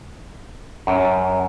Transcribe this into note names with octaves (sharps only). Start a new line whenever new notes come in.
F#2